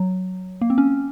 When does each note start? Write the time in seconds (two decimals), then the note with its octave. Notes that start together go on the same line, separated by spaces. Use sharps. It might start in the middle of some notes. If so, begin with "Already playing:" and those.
Already playing: F#3
0.61 A#3
0.70 C4
0.78 C#4